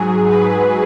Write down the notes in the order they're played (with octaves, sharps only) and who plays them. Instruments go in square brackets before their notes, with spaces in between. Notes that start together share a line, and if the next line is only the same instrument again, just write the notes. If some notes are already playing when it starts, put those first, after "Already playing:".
Already playing: [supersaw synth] G#2 F#3 G#4
B4